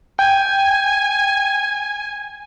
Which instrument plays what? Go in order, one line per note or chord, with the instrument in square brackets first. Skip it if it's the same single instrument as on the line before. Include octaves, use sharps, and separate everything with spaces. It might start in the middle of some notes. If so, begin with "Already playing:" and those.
[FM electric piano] G5 [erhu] G#5